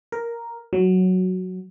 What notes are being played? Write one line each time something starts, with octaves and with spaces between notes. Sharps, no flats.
A#4
F#3